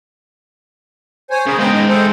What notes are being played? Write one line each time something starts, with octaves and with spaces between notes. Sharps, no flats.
C5 C#5 G#5
C#3 G#4 A#4
G#3 B3 C5 D#5 G5
D#4 D#5
A4 C5